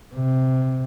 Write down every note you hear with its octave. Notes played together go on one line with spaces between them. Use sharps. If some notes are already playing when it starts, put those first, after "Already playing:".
C3